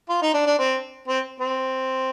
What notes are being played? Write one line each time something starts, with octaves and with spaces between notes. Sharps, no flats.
F4
D#4
D4
D4
C4
C4
C4